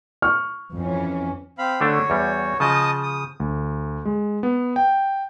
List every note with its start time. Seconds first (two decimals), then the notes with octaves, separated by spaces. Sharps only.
0.22 C#6 F6
0.75 F2 E3 C#4
1.58 C4 F5 B5
1.81 D3 A3 D4 F#4 C#5
2.10 E2 G3
2.60 C#3 F3 D#5 A5 D#6
3.03 D#6
3.40 D2
4.05 G#3
4.43 B3
4.76 G5